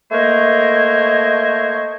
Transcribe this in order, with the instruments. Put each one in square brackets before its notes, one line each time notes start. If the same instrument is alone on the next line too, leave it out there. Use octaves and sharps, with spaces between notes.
[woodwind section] A3 A#3 A#4 C5 C#5 D#5